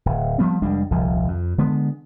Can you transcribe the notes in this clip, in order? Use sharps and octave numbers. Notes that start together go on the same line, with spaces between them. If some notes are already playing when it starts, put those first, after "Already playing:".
D1
F3 G3 B3 C4
F1 G3 G#3 D4
D#1 C2 F3
F2
D3 G#3 B3